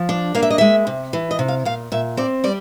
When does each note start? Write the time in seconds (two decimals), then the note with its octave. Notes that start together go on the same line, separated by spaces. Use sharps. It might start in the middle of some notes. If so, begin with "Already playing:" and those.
Already playing: F3
0.09 D4
0.35 A#3 F5
0.42 E5
0.50 D#5
0.58 G#3 E5
0.87 C3
1.13 E3
1.31 D#5
1.39 C3
1.48 F5
1.65 A#2 F5
1.92 A#2 E5
2.17 C4 D5
2.44 G3 D5